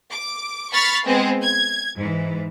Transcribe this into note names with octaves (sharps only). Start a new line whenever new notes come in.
D6
B5 C#6 F6 A6 B6 C7
G#3 B3 C4
G#6
G#2 E3